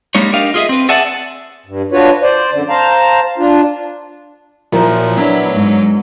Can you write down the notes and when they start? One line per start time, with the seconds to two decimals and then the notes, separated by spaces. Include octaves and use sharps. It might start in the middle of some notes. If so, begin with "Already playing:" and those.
0.15 G3 G#3 A#3 D#4 C#5
0.33 D4 G4 A#4 D#5 F5
0.54 F4 G#4 D#5 E5
0.69 C4 B4
0.89 G#4 D5 E5 F#5 G#5 A5
1.66 G2
1.92 D4 F4 F#4 B4 C#5
2.22 C5 D5
2.52 F#2 D3
2.69 C5 F5 A5 A#5
3.38 D4 F4
4.72 A#2 F3 F#3 E4 A#4
5.17 F#3 B3 D4 E4
5.53 G#2